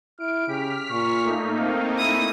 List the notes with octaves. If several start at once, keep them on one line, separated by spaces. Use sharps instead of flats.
E4 F6 D7
C#3 G4 F6 B6
A#2 C#6
A3 A#3 D#4
C4 F5
E4 D#6